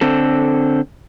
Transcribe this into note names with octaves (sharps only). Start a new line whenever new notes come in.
D3 C4 A4